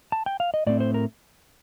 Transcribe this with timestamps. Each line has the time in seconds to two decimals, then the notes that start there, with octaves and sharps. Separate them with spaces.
0.12 A5
0.26 G5
0.40 F5
0.54 D#5
0.67 A2 A3 C4 D5
0.80 C5
0.94 A#4